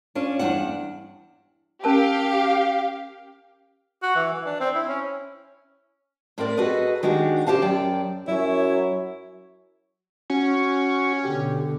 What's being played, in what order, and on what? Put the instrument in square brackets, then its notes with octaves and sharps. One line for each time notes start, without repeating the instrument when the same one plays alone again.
[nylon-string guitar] C#4 D4 F4
E2 G2 D4 F#5
[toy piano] C#4 A#4 A5 [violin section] G4 F5
[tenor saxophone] F#4
E3
E3
D4
C4
E4
C#4
[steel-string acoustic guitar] A2 C4 A#4 D5
F#4 G#4 A4 B4 D#5
D#3 G#3 D4 F#4 G4
C#3 F4 G4 C5 F5 A5
F#2 D5 G5
[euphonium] F#2 [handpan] F#3 F#4 [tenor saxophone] E4 [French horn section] C#5
[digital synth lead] C#4 [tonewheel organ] F#4 C#6
[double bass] B2 D3 [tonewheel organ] G4